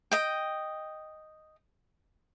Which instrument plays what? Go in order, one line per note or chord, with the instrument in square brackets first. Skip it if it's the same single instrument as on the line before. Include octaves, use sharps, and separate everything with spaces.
[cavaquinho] D#5 G5